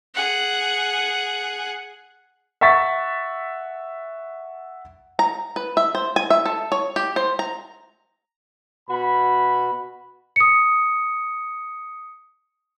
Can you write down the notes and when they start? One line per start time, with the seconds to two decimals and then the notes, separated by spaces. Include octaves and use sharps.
0.15 G#4 F#5
2.61 E5 F#5 C#6 A6 B6
5.19 A#5
5.56 B4
5.77 E5
5.95 C5
6.16 G#5
6.30 E5
6.46 A4
6.72 C#5
6.96 G4
7.16 C5
7.39 A#5
8.89 B2 F#4 B5
10.36 D#6 C#7